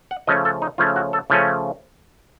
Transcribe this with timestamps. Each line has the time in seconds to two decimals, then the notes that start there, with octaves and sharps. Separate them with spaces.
0.11 F#5
0.27 C#3 F3 A3 C#4 D#5
0.45 A4
0.62 D#4
0.78 C#3 F3 A3 C#4 F4
0.96 F#4
1.13 A4
1.30 C#3 F3 A3 C#4